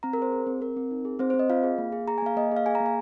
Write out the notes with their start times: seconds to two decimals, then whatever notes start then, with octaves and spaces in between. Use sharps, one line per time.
0.03 C4 A#5
0.13 A#4
0.18 G#4 C5
0.32 G#4
0.47 C4
0.61 C4 A#4
0.77 C4
0.91 D#4
1.05 G#4
1.19 C4 C5
1.30 C4 C5
1.39 D#5
1.50 F4 F5
1.63 G#4
1.78 A#3
1.92 G#4
2.08 G#4 A#5
2.18 G#5
2.22 A#3 F5
2.36 A#3 D#5
2.52 G#4 F5
2.66 G#4 G#5
2.75 A#5
2.80 A#3
2.86 G#5